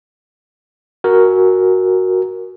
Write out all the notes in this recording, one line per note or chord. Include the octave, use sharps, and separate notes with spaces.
F#4 A#4